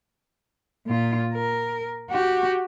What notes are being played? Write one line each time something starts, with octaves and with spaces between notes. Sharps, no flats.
A#2 F4
A#4
F#4 G4